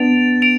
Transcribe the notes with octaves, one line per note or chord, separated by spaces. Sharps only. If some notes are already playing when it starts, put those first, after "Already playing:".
Already playing: B3 D4 A6 D7 F7
D7 F7